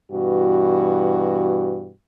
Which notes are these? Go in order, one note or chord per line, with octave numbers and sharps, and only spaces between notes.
G2 B2 E3 F#4